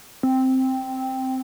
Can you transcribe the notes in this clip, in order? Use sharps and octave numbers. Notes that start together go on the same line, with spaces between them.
C4